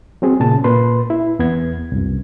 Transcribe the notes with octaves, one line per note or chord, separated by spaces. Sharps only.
F#3 C4 G#4
A#2 C#3 A5
A#2 B4 C6
E4
E2 B3 G#6
C2 F#2